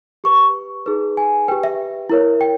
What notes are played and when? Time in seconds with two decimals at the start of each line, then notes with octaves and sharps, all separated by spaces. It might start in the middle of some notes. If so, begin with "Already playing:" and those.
0.24 G4 B4 C#6
0.35 C#6
0.86 D#4 G#4 B4
1.17 G#5
1.48 G4 B4 G5
1.63 E5
2.10 E4 A#4 C#5
2.41 G5